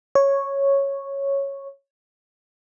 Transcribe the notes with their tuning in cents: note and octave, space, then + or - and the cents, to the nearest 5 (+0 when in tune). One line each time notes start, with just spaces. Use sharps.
C#5 -5